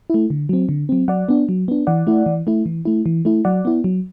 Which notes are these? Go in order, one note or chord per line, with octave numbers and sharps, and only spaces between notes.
A3 E4
D3
F#3 C4
D3
F#3 C4
F#3 D5 F#5
B3 D4
F#3
B3 D4
E3 D5 F#5
A3 E4
E3
A3 E4
E3
A3 E4
E3
A3 E4
F#3 D5 F#5
B3 E4
F#3